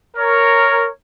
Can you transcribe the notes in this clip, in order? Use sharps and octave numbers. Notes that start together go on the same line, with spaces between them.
A#4 C#5